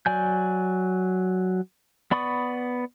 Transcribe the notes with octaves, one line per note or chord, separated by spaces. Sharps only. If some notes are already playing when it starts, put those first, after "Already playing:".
F#3 D5 G#5 G6
B3 D5 B5 C#6 D#6